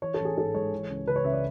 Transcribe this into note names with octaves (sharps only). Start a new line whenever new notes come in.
E3 C#5
A4
A1 G#4
G#2 A4
G#3 C#5
E3
C#2
C#3 B4
C#5
C#2 E5
D5